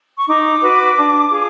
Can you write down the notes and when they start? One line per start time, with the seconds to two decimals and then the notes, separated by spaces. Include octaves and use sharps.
0.16 C#6
0.28 D#4 D6
0.62 F#4 B4
0.97 D4
1.31 F4 G#4